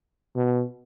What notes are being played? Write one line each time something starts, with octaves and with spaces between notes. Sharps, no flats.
B2